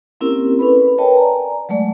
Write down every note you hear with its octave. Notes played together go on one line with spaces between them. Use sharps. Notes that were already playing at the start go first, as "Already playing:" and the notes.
A#3 C4 C#4 E4 G4 A#4
C#4 A4 B4 B5
A#4 B4 C#5 D#5 G5 A5
D5 G#5 A#5
F#3 G#3 A3 D5